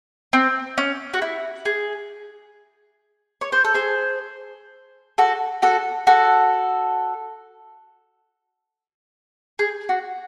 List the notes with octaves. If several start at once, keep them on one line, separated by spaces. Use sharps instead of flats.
C4
C#4
F#4
E4
G#4
C#5
C5
A4
G#4 C5
F#4 A4
F#4 A4
F#4 A4
G#4
F#4